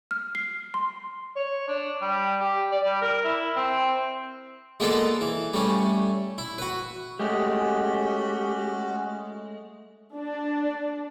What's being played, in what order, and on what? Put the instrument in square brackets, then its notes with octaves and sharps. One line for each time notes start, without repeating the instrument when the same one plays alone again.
[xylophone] F6
C7
C6
[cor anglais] C#5
D4
G3
G4
D5
G3
A#4
E4
C4
[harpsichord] G#3 A#3 B3 F4 A4 D5
E3
G3 A3 C#4
E4
F#4 B4
[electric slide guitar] G#3 A3 [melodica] C#4 F#4 [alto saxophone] G4
[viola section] D4